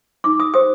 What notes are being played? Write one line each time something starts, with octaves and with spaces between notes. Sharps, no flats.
D#4 D6
D#6
G4 C5 D#6